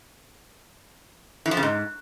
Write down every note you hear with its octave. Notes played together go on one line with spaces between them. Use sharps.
E3
F3
C#3
G#2